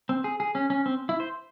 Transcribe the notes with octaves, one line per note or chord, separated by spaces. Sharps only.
C4
G#4
G#4
C#4
C#4
C4
E4
C5